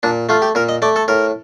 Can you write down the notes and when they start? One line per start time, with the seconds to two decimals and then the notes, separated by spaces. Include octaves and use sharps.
0.03 A#2 D4
0.29 A3 F4
0.42 G4
0.55 A#2 A#4
0.69 D#5
0.82 A3 D5
0.96 A4
1.08 A2 A#4